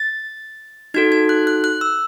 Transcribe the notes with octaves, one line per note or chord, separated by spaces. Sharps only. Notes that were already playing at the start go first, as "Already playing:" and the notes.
Already playing: A6
D#4 F#4 A4 G#6
G#6
F#6
F#6
F#6
E6